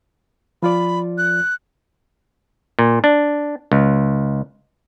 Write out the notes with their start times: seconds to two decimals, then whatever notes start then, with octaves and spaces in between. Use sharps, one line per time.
0.63 F3 F4 D5 B5
1.18 F#6
2.79 A#2
3.04 D4
3.72 C#2